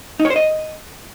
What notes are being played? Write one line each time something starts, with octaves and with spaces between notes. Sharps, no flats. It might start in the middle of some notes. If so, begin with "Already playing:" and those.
D#4
C#5
C5
D#5